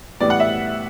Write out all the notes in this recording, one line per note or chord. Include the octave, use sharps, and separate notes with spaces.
A2 E3 G3 B3 D5
F#5
E5